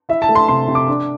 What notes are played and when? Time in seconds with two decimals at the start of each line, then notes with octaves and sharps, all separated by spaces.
0.09 E4 E5
0.22 A5
0.29 A3
0.35 C6
0.48 C3 C6
0.68 C3
0.75 D6
0.88 D4